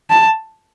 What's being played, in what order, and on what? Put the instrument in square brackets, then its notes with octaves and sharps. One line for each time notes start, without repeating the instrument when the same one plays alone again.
[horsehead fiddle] A5